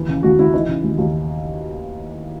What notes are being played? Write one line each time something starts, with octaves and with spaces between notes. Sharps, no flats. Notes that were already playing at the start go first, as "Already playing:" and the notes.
Already playing: D#2 E3
C#3
D#2 F#4
D#2 E4
E3 D#4
C#3
D#2
D#2